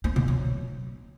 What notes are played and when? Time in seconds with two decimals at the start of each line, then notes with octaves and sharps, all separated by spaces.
0.04 C4
0.16 B2
0.28 F#3